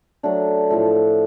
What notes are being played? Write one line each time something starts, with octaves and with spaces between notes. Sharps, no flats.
F#3 A3 D4
A2 F3 A3